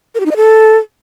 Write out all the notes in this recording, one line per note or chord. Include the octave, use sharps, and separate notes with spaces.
A#4
G4
D#4
D#5
A4